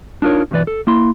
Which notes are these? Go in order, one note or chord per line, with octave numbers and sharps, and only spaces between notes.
D4 D#4 F4 A#4 C#5
B1 G2 E3 B4 D5
A4
A#3 E4 C6